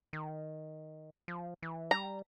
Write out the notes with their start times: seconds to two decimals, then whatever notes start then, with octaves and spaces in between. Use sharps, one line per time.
0.13 D#3
1.28 F3
1.62 E3
1.91 G3 A#5